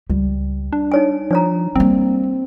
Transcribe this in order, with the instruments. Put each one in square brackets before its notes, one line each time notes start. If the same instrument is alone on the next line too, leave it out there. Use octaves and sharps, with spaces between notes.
[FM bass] C#2 [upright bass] G3
[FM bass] D4
[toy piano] D#4 C#5 G#5
[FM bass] F3 [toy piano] D4 C#5 A#5
[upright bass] G3 A#3 [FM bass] C4